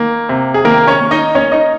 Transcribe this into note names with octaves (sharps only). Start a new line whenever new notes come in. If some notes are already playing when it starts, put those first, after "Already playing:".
Already playing: D#3 A#3
C3
G#4
D#3 A#3 A#4
C#4 C#5
A#3
D#4 D#5
A#3 C#4 C#5
D#4 D#5